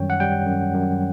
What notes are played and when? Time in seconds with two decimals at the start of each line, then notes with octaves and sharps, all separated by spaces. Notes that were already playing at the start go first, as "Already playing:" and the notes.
Already playing: F#2 D#3 G3 C#5 G5
0.10 F#5
0.20 G3 G5
0.47 F#2
0.75 F#2